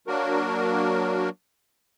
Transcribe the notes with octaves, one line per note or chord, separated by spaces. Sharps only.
F#3 A#3 D4 F#4 A#4